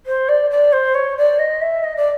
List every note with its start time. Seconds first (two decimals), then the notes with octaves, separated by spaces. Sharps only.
0.06 C5
0.28 D5
0.50 D5
0.72 C5
0.94 C#5
1.17 D5
1.39 D#5
1.61 E5
1.83 D#5
1.96 D5